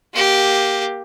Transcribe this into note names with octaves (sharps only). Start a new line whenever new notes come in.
A#3 G4